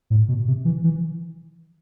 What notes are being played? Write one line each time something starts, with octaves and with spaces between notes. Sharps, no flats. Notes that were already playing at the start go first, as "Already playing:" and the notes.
A2
B2
C3
E3
E3